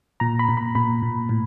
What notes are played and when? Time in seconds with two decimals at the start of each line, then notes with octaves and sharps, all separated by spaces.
0.20 A#2 A#5
0.39 B5
0.48 A#2
0.57 B5
0.75 A#2 B5
1.02 A#2
1.29 A2